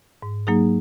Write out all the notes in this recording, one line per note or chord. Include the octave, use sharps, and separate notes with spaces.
G#2
F#3 A#3 D#4 G#4